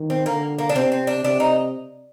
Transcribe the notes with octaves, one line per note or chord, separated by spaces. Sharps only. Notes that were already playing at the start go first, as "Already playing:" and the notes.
Already playing: D#3
C4
D3 A#3
A#3
D4
C3 C4
C4
D4
C3 D4
D#4